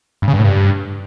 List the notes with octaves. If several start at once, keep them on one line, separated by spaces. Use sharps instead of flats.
G2
C#3
G2
A2
G2